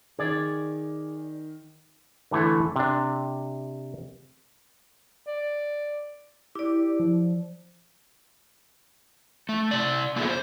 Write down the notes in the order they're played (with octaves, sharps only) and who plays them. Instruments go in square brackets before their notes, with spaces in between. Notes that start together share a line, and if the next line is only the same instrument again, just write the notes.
[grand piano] D#3 [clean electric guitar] G#4 D5
[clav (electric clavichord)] D3 E3 A3 E4 A4
C3 D4
[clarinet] D5
[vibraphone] E4 D5 [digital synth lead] G4
[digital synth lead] F3
[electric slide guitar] A3
C3 D5
A#3 B3 F4 G#4 A4 E5
C5